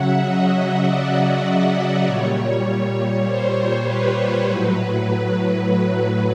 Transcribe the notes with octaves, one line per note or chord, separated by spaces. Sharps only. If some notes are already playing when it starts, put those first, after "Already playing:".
Already playing: C#3 F#3 E5 F#5
D#5
D5
A#2 G3 C#5
C5
B4
A2 F#3
B4